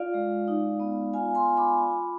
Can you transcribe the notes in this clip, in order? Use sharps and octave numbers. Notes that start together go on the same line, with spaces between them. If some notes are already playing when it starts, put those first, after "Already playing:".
Already playing: F4 D5 F5
G#3
D#4
B3
F4 F5 G#5
G#5 C6
F4
B5 D6
F4